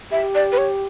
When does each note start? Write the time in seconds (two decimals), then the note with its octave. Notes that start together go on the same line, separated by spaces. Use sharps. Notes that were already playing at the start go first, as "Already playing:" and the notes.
0.12 G4 E5
0.35 D5
0.52 B4
0.58 C#5